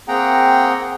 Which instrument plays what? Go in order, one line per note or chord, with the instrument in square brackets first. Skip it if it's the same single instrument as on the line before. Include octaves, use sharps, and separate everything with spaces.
[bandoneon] A#3 C4 G#4 F#5 G5 A#5